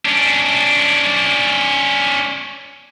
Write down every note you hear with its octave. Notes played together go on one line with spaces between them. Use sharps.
C#4 D4